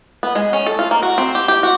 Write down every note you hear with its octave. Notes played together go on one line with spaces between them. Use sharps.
B3
G#3
C#4
A4
F4
A#3
F#4
C4
G4
G4
F#4